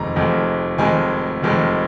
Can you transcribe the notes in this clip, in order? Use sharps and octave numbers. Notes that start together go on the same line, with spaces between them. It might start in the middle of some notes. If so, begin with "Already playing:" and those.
Already playing: F1 F2 D#3 G#3 A#5
F1 F2 D#3 G#3
F1 F2 D#3 G#3 G#5
F1 F2 D#3 G#3